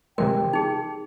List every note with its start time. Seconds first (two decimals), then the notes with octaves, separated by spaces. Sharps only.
0.18 C3 E3 G#3 G4 A#4 G5
0.53 D#4 G#4